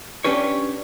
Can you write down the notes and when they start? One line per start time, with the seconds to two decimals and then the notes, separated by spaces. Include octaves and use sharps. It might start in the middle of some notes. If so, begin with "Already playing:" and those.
0.24 C#4 D4 G4 B4 C#5